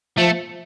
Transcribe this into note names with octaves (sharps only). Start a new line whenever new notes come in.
F3 A3